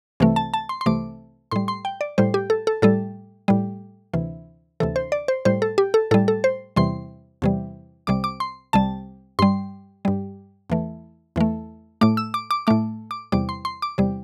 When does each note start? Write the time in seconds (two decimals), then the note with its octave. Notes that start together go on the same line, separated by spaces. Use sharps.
0.20 C2 C3 E3 A3
0.36 A5
0.54 A5
0.69 C6
0.81 C6
0.86 C2 C3 E3 A3 D6
1.51 A2 G3 C6
1.68 C6
1.85 G5
2.01 D5
2.18 A2 G3 C5
2.34 G4
2.50 A4
2.67 A4
2.82 A2 G3 A4
3.48 A2 G3
4.14 D2 C3 E3
4.80 D2 C3 E3 A4
4.96 C5
5.12 D5
5.28 C5
5.45 A2 G3 C5
5.62 A4
5.78 G4
5.94 A4
6.11 A2 A4
6.14 G3
6.28 A4
6.44 C5
6.76 E2 C3 E3 G3 C6
7.42 E2 C3 E3 G3
8.07 C2 C3 G3 D6
8.24 D6
8.40 C6
8.73 C2 C3 G3 A5
9.39 G2 G3 C6
10.05 G2 G3
10.70 E2 E3 A3
11.36 E2 E3 A3
12.01 A2 A3 D6
12.17 E6
12.34 D6
12.51 D6
12.67 A2 A3 D6
13.11 D6
13.32 E2 C3 G3 D6
13.49 C6
13.65 C6
13.82 D6
13.98 E2 C3 G3